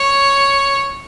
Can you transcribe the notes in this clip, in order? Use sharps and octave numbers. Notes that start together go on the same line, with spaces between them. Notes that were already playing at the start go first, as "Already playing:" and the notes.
Already playing: C#5